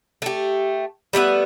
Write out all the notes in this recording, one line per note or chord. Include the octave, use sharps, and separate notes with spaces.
A3 G4
G3 A3 B3 E5